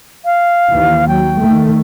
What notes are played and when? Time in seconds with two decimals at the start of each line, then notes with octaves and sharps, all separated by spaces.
0.25 F5
0.71 D#2 E3
1.08 F#3 G5
1.40 D#3 A3